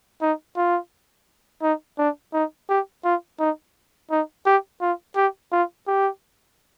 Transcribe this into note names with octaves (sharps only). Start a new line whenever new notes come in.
D#4
F4
D#4
D4
D#4
G4
F4
D#4
D#4
G4
F4
G4
F4
G4